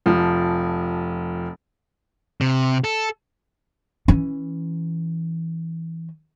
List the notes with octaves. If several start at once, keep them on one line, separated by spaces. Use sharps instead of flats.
F1 F3
C3
A4
E3 C#4